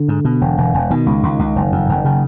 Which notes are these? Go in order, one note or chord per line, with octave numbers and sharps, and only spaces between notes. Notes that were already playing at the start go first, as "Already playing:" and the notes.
Already playing: D3
G#2
B2
E1
E1
E1
B2 D#3
C#2
C#2
C#2
F#1
F2
F#1
C#3